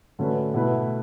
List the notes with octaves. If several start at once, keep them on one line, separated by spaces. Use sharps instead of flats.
D3 A3 C#4 F#4 B4
B2 A3 E4 B4